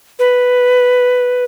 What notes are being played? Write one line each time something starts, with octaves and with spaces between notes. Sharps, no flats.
B4